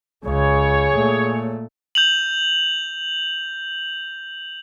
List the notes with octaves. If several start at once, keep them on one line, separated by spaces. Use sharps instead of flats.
C#2 C#3 G#4 C#5
A#2 A3
G6 F7 F#7